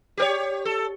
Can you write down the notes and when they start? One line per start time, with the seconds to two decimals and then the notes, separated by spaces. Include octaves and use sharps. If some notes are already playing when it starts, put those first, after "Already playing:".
0.17 G4 A#4 C#5
0.65 A4